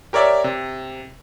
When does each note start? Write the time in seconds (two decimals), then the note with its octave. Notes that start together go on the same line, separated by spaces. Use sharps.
0.13 G4 A#4 C#5 D5 E5
0.44 C3